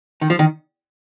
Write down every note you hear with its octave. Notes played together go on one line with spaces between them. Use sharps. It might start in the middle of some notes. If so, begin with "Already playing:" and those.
D#3
F3
D#3